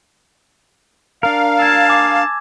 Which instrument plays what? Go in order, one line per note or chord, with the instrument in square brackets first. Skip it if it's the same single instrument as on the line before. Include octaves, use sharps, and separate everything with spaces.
[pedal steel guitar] D4 A#4 [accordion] F5
[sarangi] A5 [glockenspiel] E6 G#6
[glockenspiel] G#5 D6 A#6